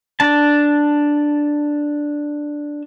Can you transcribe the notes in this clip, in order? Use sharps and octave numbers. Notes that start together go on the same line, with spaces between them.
D4 A5